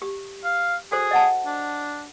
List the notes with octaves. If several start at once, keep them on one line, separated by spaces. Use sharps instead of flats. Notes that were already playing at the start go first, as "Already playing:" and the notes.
G4
F5
F#4 G#4 A4 C5
D#5 F#5 A5
D4